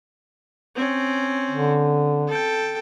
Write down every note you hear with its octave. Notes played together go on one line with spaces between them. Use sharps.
C4 C#4
D3
A4 G5